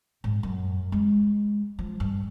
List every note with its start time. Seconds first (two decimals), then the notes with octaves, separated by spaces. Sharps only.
0.24 G#2
0.43 F#2
0.92 G#3
1.79 F3
2.00 G2